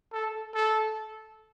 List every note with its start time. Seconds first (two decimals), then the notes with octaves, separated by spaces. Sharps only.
0.12 A4
0.54 A4